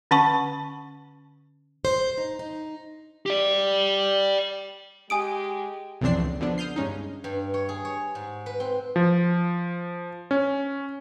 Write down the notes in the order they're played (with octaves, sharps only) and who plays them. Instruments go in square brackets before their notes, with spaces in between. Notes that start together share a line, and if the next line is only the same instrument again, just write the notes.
[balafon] D3 C#4 F#5 A5 C#6
[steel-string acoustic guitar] C5
D#4
D#4
[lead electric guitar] G4 D5
[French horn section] G#3 G4 [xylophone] G#5 D#6 D7
[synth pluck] B1 F2 E3 C4 D4 C7
C#2
D3 F3 B3 D4
D#6 F6 G6 C7
G2 G#3 C#4 D#4
[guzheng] G2
C#5
G#4
C#5
G#2
B4
C4
[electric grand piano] F3
C#4